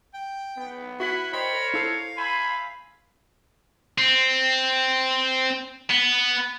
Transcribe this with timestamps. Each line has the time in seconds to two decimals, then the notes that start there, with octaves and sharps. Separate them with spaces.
0.14 G5
0.57 B3
1.00 E4 F#4 F#5 G#5 B5
1.33 A#4 C5 C#5 D#5 G5 B5
1.74 E4 A4 F5 C7
2.17 C5 E5 G#5 B5
3.98 C4
5.90 B3